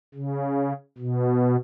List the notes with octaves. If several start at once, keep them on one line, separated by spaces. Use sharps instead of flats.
C#3
B2